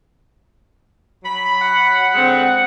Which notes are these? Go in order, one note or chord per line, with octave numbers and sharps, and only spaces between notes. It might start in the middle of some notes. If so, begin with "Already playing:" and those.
F#3 B5
F#5
D3 G#3 C4